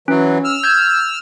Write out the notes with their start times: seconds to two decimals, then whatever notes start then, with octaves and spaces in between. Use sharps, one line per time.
0.08 E3 F#3 C#4
0.44 E6 F6
0.64 G6 G#6